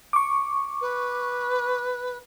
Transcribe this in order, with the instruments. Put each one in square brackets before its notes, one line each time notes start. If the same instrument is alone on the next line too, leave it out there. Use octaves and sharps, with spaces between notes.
[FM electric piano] C#6 D6
[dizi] B4